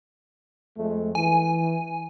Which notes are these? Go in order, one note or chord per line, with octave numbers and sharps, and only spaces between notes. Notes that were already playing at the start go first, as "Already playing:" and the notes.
F2 G#3 A3
E3 G#5